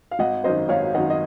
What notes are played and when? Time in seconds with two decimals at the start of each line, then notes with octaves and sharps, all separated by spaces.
0.11 F5
0.19 G#1 D#5 F#5
0.44 F#2 D#3 C5 D#5
0.69 G#1 C#5 F5
0.94 F#2 D#3 D#5 F#5
1.10 D#5